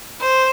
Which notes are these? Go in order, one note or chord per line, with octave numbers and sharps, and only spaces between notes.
C5